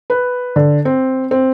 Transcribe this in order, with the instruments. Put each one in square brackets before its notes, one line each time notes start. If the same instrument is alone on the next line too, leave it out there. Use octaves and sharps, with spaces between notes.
[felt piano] B4
D3
C4
C4